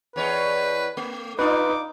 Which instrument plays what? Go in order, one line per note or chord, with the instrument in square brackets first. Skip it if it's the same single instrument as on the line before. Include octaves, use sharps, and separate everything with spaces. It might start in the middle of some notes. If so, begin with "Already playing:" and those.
[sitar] E2 C#5 D#5 [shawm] B4
[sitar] A3
[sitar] D4 F4 [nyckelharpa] D#4 [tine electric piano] B4 [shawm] D6